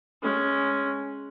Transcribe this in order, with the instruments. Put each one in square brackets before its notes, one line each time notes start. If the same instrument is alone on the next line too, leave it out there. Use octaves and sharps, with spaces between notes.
[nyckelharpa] G#3 C#4